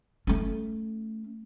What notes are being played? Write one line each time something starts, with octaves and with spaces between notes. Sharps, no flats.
A3 C#4